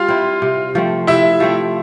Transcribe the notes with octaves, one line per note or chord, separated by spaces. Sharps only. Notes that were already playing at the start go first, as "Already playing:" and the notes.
Already playing: G3 F4 F5
C4 E4
C3
F3 A3 C4
C3 E4 E5
F3 A3 C4